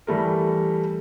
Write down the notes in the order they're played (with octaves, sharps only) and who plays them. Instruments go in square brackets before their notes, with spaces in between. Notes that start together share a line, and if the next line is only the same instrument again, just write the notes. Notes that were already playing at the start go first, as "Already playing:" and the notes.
[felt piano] E3 G3 A3 A#4